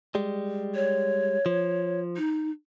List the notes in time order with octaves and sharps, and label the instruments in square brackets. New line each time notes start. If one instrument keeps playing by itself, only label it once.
[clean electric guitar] G3 G#3
[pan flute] C#5
[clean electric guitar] F3
[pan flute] D#4